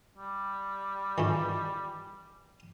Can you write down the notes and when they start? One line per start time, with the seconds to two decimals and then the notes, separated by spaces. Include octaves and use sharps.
0.18 G3
1.18 D#3 E3 A3